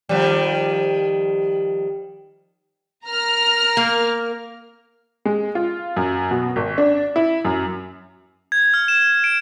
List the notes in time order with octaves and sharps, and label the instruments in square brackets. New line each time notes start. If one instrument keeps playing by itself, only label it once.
[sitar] D#3 F3 G3
[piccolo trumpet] A#4 [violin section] A#5 F6
[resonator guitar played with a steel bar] A#3
[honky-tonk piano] G#3
F4
F#2
B2
G#1
D4
E4
F#2
[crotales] G#6
F6
E7
D7